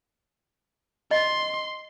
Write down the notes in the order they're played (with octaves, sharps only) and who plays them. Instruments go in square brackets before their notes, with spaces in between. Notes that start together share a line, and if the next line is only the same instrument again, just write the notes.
[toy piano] D#5 [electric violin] C6